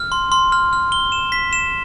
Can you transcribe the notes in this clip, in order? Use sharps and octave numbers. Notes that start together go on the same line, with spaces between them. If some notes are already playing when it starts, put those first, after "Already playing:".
Already playing: F6
C6
C6
F6
F6
G7
E7
B6
E7